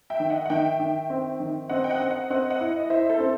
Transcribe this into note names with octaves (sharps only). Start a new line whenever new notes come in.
E5 G5
D#3
D#5 F#5
F#5
D#3 E5 G5
D#3
C4
D#3
C4 D#5 F#5
G5
D#5 F#5
C4
D#5 F#5
C4 D#5 F#5
D#5 F#5
E4
D#5
E4 C5 E5
A4 C5
C4